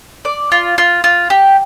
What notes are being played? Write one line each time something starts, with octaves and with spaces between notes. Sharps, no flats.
D5
F4
F4
F4
G4